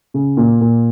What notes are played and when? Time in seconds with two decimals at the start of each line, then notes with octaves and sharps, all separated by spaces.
0.14 C#3
0.37 A#2
0.61 A#2